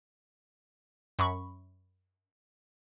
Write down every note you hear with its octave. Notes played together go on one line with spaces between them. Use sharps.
F#2 B5 C#6